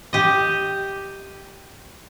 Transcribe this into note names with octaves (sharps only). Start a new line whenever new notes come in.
G4 D#5